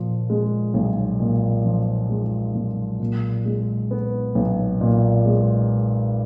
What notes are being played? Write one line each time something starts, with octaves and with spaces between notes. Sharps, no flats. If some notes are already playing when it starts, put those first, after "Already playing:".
Already playing: A#2 F3
G#3
B1
A#2
F3
G#3
B1
A#2
G#3
B3
B1
A#2
G#3